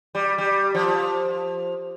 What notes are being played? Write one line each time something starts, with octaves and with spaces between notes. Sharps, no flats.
G3
G3
F3